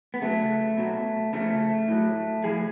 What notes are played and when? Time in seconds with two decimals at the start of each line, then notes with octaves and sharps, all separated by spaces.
0.14 B3
0.22 C#3 F#3 A3
0.77 B2 F#3
1.33 C#3 F3 A3
1.88 A2 F#3
2.44 A2 F3 G#4